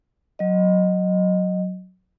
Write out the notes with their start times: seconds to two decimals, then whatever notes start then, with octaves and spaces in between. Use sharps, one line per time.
0.39 F#3 D#5